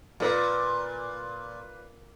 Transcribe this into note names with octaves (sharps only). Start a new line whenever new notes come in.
A#2 F4 B4 D5